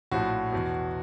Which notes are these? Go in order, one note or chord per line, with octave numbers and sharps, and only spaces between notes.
A#1 A2 F3 F#4
E2 B2